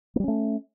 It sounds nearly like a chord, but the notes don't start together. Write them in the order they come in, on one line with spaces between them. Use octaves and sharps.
A#3 G3 C#4 A3